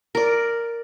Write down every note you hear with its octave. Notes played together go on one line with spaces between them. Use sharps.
A#4 D5